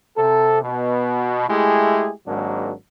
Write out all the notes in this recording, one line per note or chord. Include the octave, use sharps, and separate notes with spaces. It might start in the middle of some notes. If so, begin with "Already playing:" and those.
C3 A4
B2
G#3 A3 E4 G4 G#4
G#1 G#2 F#3 A#3 D4